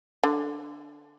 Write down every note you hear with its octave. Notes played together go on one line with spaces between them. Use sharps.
D3